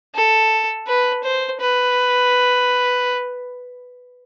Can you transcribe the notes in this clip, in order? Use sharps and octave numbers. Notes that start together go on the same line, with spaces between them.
A4
B4
C5
B4